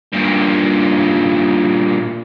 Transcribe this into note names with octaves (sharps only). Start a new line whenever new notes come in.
G2 A#2